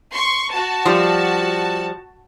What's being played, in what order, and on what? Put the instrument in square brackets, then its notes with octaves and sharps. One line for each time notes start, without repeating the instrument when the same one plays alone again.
[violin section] C6 C#6
F#4 A5
[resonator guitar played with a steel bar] F3 G3